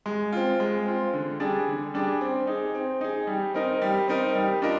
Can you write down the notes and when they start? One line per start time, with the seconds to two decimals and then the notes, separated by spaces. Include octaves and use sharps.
0.06 G#3
0.33 C4 F4
0.60 G#3
0.86 C4 F4
1.14 D3
1.40 G3 D4 G#4 D5
1.67 D3
1.94 G3 D4 G#4 D5
2.21 C4
2.47 D#4 G#4
2.74 C4
3.01 D#4 G#4
3.27 G3
3.54 C4 D#4 A#4 D#5
3.82 G3
4.08 C4 D#4 A#4 D#5
4.35 G3
4.62 D4 F4 A#4 D#5